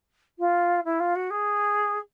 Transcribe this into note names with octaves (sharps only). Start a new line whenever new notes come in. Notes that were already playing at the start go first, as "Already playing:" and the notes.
F4
E4
F4
F#4
G#4